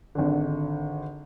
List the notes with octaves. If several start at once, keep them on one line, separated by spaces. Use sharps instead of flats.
G#1 D3